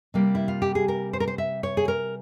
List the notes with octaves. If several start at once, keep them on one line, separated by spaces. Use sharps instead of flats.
C3 G3 A#3
E4
F4
G4
G#4
A#4
C5
A#4
C5
E5
C#5
G#4
A#4